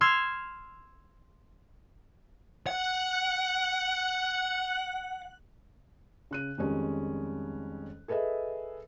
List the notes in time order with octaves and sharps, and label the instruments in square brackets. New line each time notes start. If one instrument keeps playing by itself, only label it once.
[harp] C6 E6 F6 G#6
[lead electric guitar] F#5 [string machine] F#6
[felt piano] C#3 F#6 D#7
F2 D#3 G3 G#3 C#4
G#4 A4 B4 D#5 E5